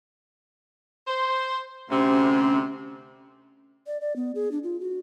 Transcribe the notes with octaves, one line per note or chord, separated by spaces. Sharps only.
C5
D2 C3 C#4
D5
D5
B3
G#4
D4
F4
F#4